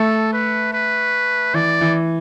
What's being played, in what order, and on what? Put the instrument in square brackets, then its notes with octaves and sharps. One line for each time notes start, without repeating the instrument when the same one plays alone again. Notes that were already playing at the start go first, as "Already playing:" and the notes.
Already playing: [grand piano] A3 [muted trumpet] A4
[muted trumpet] B4
B4
[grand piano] E3 [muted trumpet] D5
[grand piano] E3